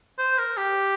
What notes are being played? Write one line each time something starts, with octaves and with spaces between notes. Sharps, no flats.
C5
A#4
G4